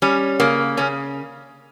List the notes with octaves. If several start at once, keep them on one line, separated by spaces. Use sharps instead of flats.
G3 C#4
C#3 A#3
C#3 C#4